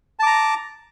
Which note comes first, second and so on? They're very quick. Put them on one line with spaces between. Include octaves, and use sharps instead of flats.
A5 D6 A#5